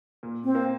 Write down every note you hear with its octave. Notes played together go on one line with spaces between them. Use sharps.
A#2
C4
A#3